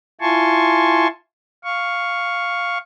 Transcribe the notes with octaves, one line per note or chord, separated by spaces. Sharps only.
E4 F4 G#5 A5 C6 C#6
F5 C#6